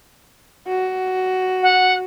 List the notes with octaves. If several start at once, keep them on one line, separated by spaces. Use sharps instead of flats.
F#4
F#5